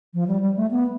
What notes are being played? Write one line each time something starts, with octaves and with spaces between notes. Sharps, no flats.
F3
G3
G3
A3
B3